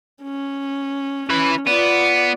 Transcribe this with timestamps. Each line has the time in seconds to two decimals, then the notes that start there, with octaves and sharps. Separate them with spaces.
0.22 C#4
1.30 E3 C#4 B4
1.67 B3 F4 D5